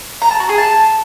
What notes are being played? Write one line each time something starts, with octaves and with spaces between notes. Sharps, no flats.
A#5
A5
F#4
G#4
A5